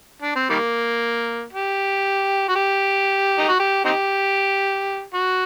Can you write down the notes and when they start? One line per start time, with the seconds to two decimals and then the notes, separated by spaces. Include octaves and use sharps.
0.22 D4
0.36 C4
0.50 D#3 G3 A#3
1.53 G4
2.49 F#4
2.56 G4
3.38 D#4
3.49 F#4
3.60 G4
3.85 C4 D#4 G4
5.15 F#4